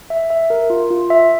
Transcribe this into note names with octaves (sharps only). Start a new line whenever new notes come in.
E5
E5
A#4
F4
F4
E5